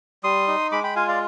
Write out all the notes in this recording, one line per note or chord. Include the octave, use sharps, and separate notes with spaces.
G3 C6 D#6
D#4
G#3 B5 D6
G5 B5
F4 F5 G#5
D5 F5